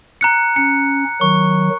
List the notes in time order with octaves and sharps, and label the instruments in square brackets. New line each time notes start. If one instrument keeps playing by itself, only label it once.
[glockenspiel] A#5 F#6 C#7
[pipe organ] C#4 [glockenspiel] C#7
[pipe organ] D#3 F#3 [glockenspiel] C#6